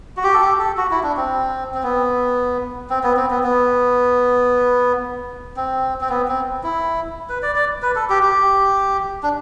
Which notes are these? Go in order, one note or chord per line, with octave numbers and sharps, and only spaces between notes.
F#4
G4
A4
G4
A4
F#4
E4
D4
C4
C4
B3
C4
B3
C4
B3
B3
C4
C4
B3
C4
E4
B4
D5
D5
B4
A4
G4
G4
D4